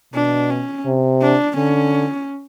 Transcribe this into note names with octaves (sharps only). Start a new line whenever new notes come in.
B2 D4
C#4
C3
D4
D3 C#4